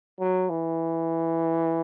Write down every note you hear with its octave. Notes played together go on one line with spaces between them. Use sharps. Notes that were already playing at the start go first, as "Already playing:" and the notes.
F#3
E3